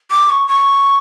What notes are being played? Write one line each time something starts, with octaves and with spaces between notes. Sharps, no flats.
D6
C#6
C#6